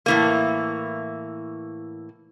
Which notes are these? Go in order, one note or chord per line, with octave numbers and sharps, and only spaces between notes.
A2 E3 A#3